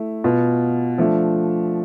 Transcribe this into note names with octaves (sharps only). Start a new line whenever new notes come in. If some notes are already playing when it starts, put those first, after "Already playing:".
Already playing: A3 E4
B2 B3 F4
F3 A3 D4